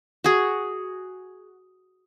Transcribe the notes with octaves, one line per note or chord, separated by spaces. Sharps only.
F#4 G#4